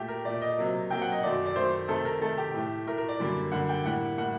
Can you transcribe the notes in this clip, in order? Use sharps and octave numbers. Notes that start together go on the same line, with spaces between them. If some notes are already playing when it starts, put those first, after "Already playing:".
Already playing: A#2 A3 G4
A#4
A#2 A3 D5
D#5
C3 F#3 A#3
C3 F#3 A#3 G5
F#5
D#5
F#2 D#3 A3 D5
D5
F#2 D#3 A3 C5
C3 D#3 A3 A4
A#4
C3 D#3 A3 A4
G4
A2 A3
A2 A3 A#4
A#4
D5
F#2 D3 G3 A#3
F#2 D3 G3 A#3 F#5
G5
A2 G3 A#3 F#5
A2 G3 A#3 F#5